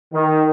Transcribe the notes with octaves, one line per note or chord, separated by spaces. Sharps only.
D#3